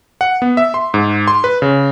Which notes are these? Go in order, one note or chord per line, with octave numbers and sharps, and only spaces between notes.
F#5
B3
E5
C6
G#2
C6
B4
C#3